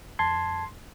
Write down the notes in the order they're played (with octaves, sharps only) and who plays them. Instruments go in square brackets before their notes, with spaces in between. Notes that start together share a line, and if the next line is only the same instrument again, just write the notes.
[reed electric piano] F2 A5 G#6 [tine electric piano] C6